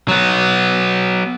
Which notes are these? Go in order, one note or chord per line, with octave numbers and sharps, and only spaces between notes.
F#3 B3